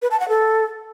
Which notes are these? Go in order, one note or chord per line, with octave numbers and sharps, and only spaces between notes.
B4
A5
F#5
A4